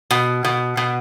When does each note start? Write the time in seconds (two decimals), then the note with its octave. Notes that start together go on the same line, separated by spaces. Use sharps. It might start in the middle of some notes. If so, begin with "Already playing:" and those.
0.11 B2
0.45 B2
0.77 B2